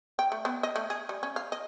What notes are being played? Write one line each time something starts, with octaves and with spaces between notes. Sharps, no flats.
G5
A3
B3
D#5
A3
G#4
G3
C#4
F5
D#5